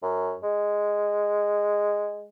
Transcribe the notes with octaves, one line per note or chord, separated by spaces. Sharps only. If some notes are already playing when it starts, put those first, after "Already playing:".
F#2
G#3